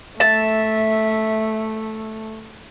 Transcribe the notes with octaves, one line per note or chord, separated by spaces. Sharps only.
A3 E5 A5